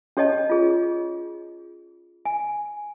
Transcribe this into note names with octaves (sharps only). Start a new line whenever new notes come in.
C#4 G4 C#5 D#5 G5 A5
F4 G#4
G#5